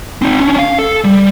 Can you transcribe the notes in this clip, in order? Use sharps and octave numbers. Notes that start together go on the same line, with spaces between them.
C4 D#4
C#4 D4
F5
A4
G3